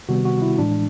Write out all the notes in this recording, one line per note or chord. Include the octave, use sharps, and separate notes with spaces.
C3 D#3 G3 B3 F#4
F#4
E4
A2 E3 G#3 D4